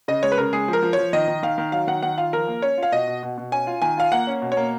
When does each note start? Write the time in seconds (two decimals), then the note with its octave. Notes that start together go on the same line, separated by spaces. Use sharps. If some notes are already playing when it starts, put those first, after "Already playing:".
0.08 C#3 D#5
0.23 G#3 C#5
0.32 B4
0.38 C#3 A#4
0.53 G#3 G#4
0.68 F3 A#4
0.83 F3
0.93 F3 C#5
1.13 D#3 D#5
1.27 D#3
1.43 D#3 F5
1.58 D#3
1.72 F#3 F5
1.87 D#3 F#5
2.02 D#3 F#5
2.18 F4 F5
2.33 F3 A#4
2.47 A#3
2.62 C#4 C#5
2.78 F4
2.83 F5
2.92 B2 D#5
3.07 B2
3.23 B2
3.38 B2
3.52 C#4 G#5
3.67 F4
3.82 D#3 G#5
3.97 F4 F5
4.12 A#3 F#5
4.27 C#4
4.42 B2
4.52 C#5
4.57 A#3